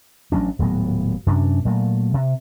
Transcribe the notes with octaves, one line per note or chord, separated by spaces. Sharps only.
A1 F#3 C#4 D4
D#1 A2 F#3 B3
F#2 C3 C#4 D4
A#2 F#3 A3
C3